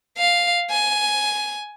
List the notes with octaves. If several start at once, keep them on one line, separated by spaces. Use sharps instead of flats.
F5
G#5